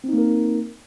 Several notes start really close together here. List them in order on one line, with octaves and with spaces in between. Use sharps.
C4 D#4 A#3 A#4